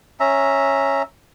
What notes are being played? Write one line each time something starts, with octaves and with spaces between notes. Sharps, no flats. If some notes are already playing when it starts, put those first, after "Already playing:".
C#4 E5 A#5